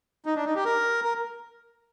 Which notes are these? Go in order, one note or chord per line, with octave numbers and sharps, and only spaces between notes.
D#4
D4
D#4
G4
A#4
A#4